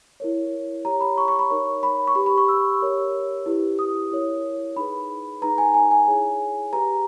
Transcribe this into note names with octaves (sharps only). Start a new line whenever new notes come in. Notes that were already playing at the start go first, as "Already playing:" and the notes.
E4 A#4 C#5
G4 C#5 A#5
B5
C#6
C#6
B5
D#4 A#4 C#5
B5
C#6
G4 B4 B5
B5
C#6
E6
G4 A#4 C#5
E4 G4 B4
D#6
E4 A#4 C#5
D#4 G#4 B4 B5
D#4 G#4 B4 A#5
G#5
G#5
G#5
E4 G#4 C#5
G4 B4 A#5